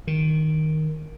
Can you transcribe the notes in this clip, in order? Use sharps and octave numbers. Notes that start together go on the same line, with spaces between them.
D#3